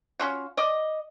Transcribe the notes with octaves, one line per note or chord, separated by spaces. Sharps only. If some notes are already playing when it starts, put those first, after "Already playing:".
C#4 F4 F#4
D5 D#5